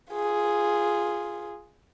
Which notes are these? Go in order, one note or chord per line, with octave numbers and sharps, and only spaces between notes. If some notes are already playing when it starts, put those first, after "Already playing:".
F4 G#4